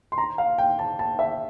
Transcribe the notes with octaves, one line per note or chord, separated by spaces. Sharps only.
C6
A#5
F5
G5
A5
A5
E5